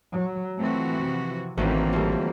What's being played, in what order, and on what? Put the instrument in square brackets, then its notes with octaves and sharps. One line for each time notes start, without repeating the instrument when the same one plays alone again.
[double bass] F#3
[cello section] E3 F3 F#4 [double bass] A3 C4
[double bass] C3
[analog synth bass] A1 [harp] D2 D#3 C#4 [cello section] E3 A#3 [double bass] C4
[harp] F2 G3